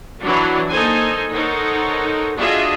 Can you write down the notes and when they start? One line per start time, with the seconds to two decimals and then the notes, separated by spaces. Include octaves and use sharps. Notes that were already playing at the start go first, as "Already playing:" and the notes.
0.21 E3 F#3 D4 F#4
0.70 A#3 D#4 A4 C5 G#5
1.32 D#4 A4 A#4 C5 C#5 F#5
2.37 D4 F4 F#4 G#4 D#5 E5